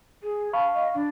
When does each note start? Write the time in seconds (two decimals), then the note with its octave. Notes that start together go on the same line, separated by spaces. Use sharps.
0.23 G#4
0.53 F5 A5 B5 C#6
0.74 D#5
0.94 D4